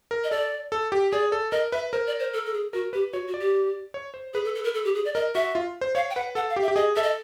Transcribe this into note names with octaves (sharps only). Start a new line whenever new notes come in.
A#4
D#5
A4 D5
A4
G4
G#4 D5
A4
A#4 D#5
B4 E5
A#4 C5
D5
C5
A4
A4
G#4
F#4 A#4
G4 B4
F#4 C#5
F#4
D5
G4
C#5
C5
G#4 B4
A4
A4
A#4
A4
G4
G#4
D5
A#4 D#5
F#4 E5
F4
C5
C#5 F5
G5
B4 F#5
A4 F#5
F5
G4
E5
G4
G#4 D#5
A4 E5
D#5